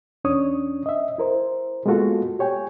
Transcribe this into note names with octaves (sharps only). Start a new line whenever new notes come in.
E2 C#4 D4 C#5 D#6
D#5 E5
E4 A#4 C5
G#3 A#3 B3 F4 F#4 A4
G4 C#5 G5 G#5